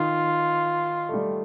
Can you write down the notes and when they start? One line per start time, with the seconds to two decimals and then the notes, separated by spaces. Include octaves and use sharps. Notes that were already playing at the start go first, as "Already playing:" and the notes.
Already playing: D#3 F4
1.09 A3
1.14 G3